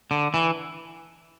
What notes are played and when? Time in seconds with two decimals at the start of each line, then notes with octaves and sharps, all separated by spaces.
0.11 D3
0.34 E3